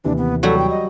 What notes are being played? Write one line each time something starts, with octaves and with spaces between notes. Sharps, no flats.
D#2 C3 E3 D4
B3
F#3 G3 F#4 A4
G5
D#5